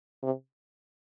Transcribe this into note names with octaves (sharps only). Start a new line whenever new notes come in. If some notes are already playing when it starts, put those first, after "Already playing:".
C3